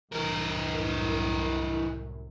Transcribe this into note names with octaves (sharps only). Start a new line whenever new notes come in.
C2 F#2 A2 E3 A#4